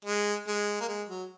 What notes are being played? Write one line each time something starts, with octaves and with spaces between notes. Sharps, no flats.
G#3
G#3
A#3
G#3
F#3